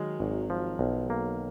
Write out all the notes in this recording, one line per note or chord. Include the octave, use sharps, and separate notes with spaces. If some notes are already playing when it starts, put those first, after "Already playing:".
Already playing: D#3 F#3 G#3
G#1
F3
B1
A#3